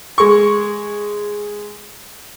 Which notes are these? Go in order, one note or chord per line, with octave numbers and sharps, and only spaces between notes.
G#3 C#6